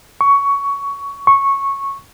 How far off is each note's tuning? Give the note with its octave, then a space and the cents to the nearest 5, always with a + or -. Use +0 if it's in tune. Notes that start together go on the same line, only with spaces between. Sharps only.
C#6 +15
C#6 -10